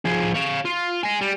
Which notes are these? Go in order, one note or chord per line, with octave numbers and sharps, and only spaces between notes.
F3 G#4
C#5 F5
F4
D#5 G#5
G3